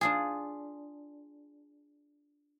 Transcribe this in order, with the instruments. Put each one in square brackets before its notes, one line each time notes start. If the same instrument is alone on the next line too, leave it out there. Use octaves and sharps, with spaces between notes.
[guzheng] D4 F4 G#4